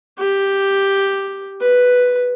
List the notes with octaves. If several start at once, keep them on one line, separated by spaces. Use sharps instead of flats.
G4
B4